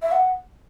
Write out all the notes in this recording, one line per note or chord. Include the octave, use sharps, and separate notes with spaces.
E5
F#5